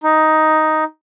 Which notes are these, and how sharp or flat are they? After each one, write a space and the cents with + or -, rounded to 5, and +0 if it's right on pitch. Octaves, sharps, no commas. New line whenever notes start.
D#4 +5